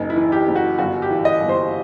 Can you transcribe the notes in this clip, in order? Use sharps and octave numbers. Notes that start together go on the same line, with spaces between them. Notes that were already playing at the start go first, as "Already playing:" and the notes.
Already playing: F#1 D#4
E4
E3
G4
F#1
F#4
G1 F#4
G4
E3
D#5
G1
C5